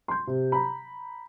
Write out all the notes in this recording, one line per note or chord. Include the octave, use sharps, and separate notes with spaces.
C6 G6
C3
A#5 B5